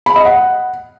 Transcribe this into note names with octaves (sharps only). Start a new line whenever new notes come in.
B5
D#5
F#5